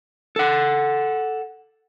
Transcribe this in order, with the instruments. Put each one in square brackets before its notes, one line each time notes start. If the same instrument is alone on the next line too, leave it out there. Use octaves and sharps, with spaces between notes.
[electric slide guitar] A4 F#5